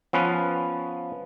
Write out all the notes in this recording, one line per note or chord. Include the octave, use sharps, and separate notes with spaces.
F3 B3 C#4 B4